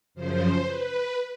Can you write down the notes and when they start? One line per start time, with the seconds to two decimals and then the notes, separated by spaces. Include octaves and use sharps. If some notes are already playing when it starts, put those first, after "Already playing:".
0.14 F#2 C#3 F3 C5
0.63 B4